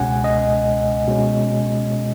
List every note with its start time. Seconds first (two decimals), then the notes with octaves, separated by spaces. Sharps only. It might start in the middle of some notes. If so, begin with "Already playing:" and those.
Already playing: C#2 B2 G#3 C#4 F#5 G#5
0.24 D#5
1.07 B2 G#3 C#4